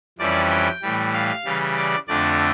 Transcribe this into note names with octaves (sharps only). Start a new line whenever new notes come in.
F2 E3 G3 C#4 E4 D5
G5
A2 E3 G3
F5
C#3 E3 G3
D5
F2 D3 A3 D4 D5